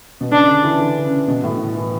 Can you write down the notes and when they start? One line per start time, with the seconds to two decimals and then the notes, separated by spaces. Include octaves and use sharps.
0.21 B2
0.32 C#3 D4
0.48 D3
0.64 E3
0.80 D3
1.05 C#3
1.28 B2
1.44 A2
1.77 E3